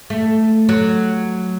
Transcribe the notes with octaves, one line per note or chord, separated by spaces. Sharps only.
A3
F#3